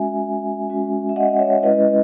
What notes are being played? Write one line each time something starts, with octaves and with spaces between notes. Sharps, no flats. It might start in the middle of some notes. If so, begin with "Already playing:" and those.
Already playing: G#3 C#4 F#4 E5 G#5
G#3 C#4 F#4
E5
D#5 F#5
C#5 E5
G#3 C#4 E4 B4 D#5